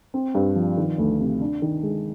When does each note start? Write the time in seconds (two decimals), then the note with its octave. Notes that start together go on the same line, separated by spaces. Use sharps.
0.14 C4
0.35 G2
0.56 F3
0.77 D#3
0.98 D2
1.20 C3
1.41 D4
1.62 D#3
1.83 G#3